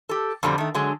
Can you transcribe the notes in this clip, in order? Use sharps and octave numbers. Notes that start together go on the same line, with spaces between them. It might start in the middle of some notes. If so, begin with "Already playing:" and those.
G4 A4
F2 B2 D3 G3 C4
D#3 A3
D3 F#3 G#3